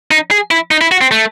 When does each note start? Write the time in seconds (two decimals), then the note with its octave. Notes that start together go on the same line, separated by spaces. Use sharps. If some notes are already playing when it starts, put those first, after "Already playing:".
0.11 D#4
0.31 G#4
0.51 E4
0.71 D#4
0.81 E4
0.92 F#4
1.01 C4
1.11 A3